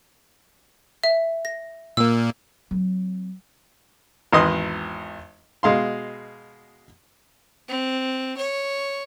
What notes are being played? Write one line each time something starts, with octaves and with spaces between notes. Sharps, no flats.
E5
A#6
A#2 A#3 E6
F#3 C4
G#1 E2 B4 D#5 C6 D#6
B2 G#3 F5 C6
C4
C#5